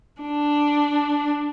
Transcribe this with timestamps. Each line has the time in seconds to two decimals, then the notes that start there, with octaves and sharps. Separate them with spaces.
0.22 D4